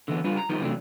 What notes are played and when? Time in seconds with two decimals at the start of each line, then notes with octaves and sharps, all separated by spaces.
0.08 D3 E3 B3
0.24 G3 D4 F4 B4
0.37 A#5
0.49 D#3 F3 G3 B3 D#4 B4
0.61 C3 E3 F#3 A3 D4